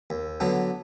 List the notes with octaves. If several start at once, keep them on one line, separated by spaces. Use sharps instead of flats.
D#2
D3 F#3 B3 D4